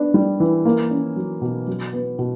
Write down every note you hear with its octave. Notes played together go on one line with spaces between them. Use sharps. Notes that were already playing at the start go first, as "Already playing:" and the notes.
Already playing: B3 D4
G3
E3
A#3
C#4
F#3
B2
F#3
B3
B2